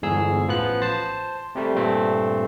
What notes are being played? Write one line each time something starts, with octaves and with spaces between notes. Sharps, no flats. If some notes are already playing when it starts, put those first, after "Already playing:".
G1 E2 G#2 G#4 E6
A1 F3 B3 F#6
C5 A5
C3 G3 A3
G2 A#2 A3 C4